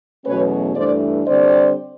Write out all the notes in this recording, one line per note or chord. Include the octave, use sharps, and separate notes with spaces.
E2 B2 F#3 A3 C#4 B4 C#5
G2 E3 A3 D4 C5 D5
D3 G3 C4 C5 D5